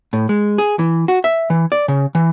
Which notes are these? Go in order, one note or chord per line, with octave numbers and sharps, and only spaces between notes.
A2
G#3
G#4
E3
F#4
E5
E3
D5
C#3
E3